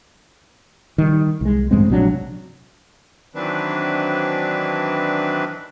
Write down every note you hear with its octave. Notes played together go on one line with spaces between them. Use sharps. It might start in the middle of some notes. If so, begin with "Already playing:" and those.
D#3 G3
C2 G#3
A1 G2 G#3 C4
A#1 C3 F#3 D4
D#3 E3 F#3 C4 D4 B4